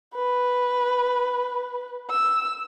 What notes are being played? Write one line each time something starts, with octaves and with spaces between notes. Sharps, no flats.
B4
E6